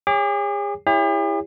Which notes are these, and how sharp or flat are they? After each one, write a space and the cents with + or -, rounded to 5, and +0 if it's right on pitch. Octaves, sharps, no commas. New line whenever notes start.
G#4 -40 C#5 +0 D6 +0
E4 +0 G4 +45 C#5 +15